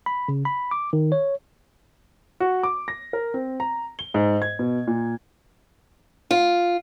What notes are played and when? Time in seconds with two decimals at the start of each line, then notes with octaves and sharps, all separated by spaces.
0.06 B5
0.28 C#3
0.45 B5
0.71 D6
0.93 D#3
1.12 C#5
2.40 F#4
2.63 D6
2.88 A#6
3.13 A#4
3.34 C4
3.60 A#5
3.99 G7
4.14 G#2
4.42 G#6
4.59 B2
4.87 A#2
6.31 F4